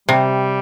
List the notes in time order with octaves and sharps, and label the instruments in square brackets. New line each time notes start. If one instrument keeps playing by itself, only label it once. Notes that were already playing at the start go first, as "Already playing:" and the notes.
[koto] C3 [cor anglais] G3